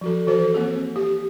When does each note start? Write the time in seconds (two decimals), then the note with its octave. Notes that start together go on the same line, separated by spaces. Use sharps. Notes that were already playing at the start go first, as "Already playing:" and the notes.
0.01 F3 F#4 A4
0.27 E3 F#4 A4 C5
0.54 A#3 C4 G#4
0.96 G4